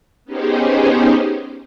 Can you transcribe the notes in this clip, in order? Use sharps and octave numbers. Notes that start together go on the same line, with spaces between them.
B3 C#4 D#4 G4 G#4 C5